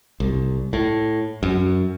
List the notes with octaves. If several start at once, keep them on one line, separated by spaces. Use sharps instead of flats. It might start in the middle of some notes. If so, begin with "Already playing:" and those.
C2
A2
F#2